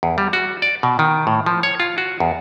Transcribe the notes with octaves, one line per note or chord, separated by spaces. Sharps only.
E2
G3
F#4
D5
B2
D#3
A2
F3
C#5
F4
F#4
E2